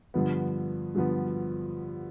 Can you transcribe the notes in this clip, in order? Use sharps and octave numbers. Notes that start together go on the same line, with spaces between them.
G2 D3 F3 B3
G2 D3 F3 B3